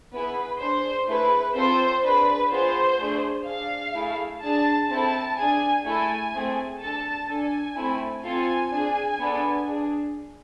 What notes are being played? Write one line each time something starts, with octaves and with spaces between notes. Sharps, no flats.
B3 E4 G#4 B4
D4 G#4 C5
A3 E4 G#4 B4
C4 F4 A4 C5
D4 G#4 B4
B3 F4 G#4 C5
A3 D4 G#4
D4 G#4 F5
A3 E4 G#4
D4 G#4 A5
C4 E4 A4 A5
D4 G#4 G#5
A3 E4 A4 G#5
A3 C4 G#4
D4 A4 A5
D4 A4 G#5
A3 C4 E4
C4 F4 A4 G#5
D4 G#4
B3 D4 A4
D4 G#4